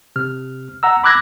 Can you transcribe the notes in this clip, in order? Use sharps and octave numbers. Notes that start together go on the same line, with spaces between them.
C3 F6
F#5 A#5 E6
B5 D6 E6 F#6 G#6 A#6